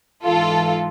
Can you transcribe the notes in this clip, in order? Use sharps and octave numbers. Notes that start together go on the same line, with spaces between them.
G#2 E3 F4 A4